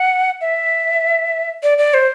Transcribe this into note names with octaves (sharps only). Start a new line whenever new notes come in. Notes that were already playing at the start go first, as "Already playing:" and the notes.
Already playing: F#5
E5
D5
D5
C5